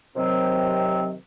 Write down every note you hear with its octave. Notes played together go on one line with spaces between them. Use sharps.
C3 D#3 F#3 C4